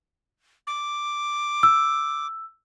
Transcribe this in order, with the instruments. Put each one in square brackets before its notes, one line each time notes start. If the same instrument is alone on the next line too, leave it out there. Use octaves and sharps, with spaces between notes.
[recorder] D6
[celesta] E6